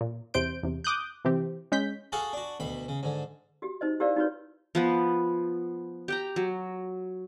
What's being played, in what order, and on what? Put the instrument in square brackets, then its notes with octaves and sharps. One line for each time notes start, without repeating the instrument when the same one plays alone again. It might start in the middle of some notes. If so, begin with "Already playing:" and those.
[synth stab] A#2
E2 C3 C5 G6 D7
E2 C3
D6 D#6 F#6 G6
C3 E3 C4 G4
G#3 C#4 G6 B6
[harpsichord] F#4 G#4 A4 F5 F#5
D4 F#4
D2 B2 B5
C#3
G#2 D3
[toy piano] F#4 G4
D#4 C5 D#5
E4 G4 A#4 C5 D5 F5
D#4 F4 F#4 B4 C#5
[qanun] F3 B3 B4
G4 G5 A#5
F#3